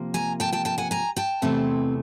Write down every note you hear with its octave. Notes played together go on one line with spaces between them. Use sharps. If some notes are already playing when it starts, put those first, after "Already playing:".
Already playing: C3 F3 A#3
G#5 A#5
G5 A5
G5 A5
G5 A5
F#5 G#5
G#5 A#5
G5 A5
E2 C3 E3 A3 C4